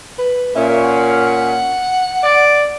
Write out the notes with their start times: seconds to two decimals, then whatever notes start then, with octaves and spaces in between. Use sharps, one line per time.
0.19 B4
0.55 A#2 C#4 E5
0.84 F#5
2.23 D5